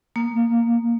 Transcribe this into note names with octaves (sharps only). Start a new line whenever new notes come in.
A#3